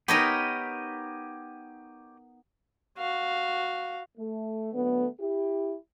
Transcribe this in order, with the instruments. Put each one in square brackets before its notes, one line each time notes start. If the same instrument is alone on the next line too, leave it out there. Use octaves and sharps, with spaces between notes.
[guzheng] B3 D#4 A#4 [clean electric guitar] G4 C#5 D#5
[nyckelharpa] F#4 F5
[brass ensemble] A3
D3 F#3 A3 B3
E4 G4